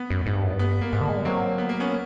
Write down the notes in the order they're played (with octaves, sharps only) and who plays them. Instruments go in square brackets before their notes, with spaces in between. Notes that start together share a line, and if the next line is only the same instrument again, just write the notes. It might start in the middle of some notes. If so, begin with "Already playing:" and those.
Already playing: [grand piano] B3
[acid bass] F#2
G#2
G2
F#2
G2
[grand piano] B3
A#3
[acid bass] G#2 [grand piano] B3
[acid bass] D3
G#3
G3
[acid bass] F#3 [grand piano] A#3 C4
[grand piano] B3
A#3
B3 C#4